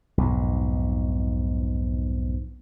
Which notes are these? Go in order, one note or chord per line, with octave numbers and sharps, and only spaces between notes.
B1 F2 G#2